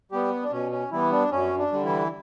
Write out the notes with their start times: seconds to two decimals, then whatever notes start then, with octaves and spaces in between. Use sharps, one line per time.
0.12 G3 B3 G4
0.43 D4
0.51 B2 C#4
0.72 C#4
0.91 E3 G3 B3 E4
1.12 D4
1.31 F#2 C#4
1.58 D4
1.72 D3 G3
1.85 E3 E4